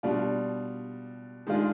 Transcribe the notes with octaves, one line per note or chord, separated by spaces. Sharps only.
B2 G3 D4 F4
D#3 G#3 D4 F4 G#4